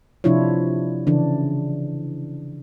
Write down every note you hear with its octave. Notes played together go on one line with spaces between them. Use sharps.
C3 F3 D4 E4 F4 C#5
C#3 E3 D4